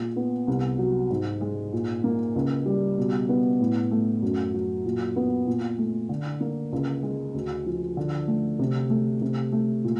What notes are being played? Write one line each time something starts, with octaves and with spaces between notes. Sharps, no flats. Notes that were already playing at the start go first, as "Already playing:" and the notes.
Already playing: A#2 G#3
B3
C2
F#3
G#2
G#3
A#2
A#3
C#2
G3
B2
B3
A2
A3
F#2
F#3
A#2
B3
A#2
A3
D3
A#3
C#2
G#3
D2
F3
D3
A3
C3
A3
C3
A3
A#2